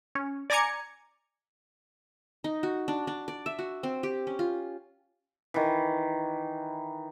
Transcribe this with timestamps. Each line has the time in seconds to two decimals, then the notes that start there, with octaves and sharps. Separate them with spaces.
0.15 C#4
0.50 D5 G#5 A#5 D6 G#6 C#7
2.44 D#4
2.63 F#4
2.88 D4
3.07 D4
3.28 D5
3.46 E5
3.59 F#4
3.83 C4
4.03 G4
4.27 C#4
4.39 F4
5.54 D#3 E3